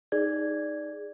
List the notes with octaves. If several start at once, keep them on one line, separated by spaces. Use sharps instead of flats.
D#4 G#4 D5 G#6